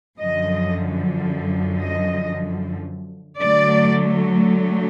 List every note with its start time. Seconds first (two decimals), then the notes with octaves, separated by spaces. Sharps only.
0.19 F#2 D3 F3 D#5
1.79 D#5
3.40 D3 F#3 A3 D5